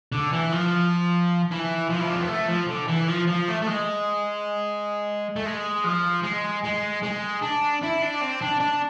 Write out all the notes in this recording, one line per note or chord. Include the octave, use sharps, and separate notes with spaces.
D3
E3
F3
E3
F3
E4
D4
C4
B3
A3
F3
D3
E3
F3
F3
A3
A3
G#3
A3
G#3
F3
G#3
G#3
G#3
D4
E4
D4
C4
D4
D4